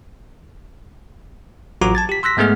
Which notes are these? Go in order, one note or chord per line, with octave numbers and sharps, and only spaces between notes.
A1 F#3 F4 F#4 A#5 D6
A5 G#6 A6
G4 B6
C6 E6 F#6 A#6 B6
G#2 G#3 A3 B3 G#4 F6